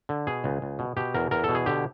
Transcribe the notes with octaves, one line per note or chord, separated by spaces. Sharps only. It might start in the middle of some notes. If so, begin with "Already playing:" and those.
D3
B2 G#4
C#2
C#2
B2
B2 G4
E2 A#4
E2 A#4
B2 A4
G#4
D3 G4